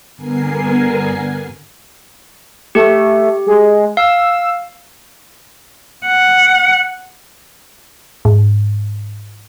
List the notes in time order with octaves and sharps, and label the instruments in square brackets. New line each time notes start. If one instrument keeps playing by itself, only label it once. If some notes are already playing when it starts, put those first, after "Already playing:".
[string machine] G2 D3 B3 A#4 G#5 C7
[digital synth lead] A3 [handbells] G4
[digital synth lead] G#3
[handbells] F5 [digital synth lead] E6
[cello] F#5
[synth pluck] G#2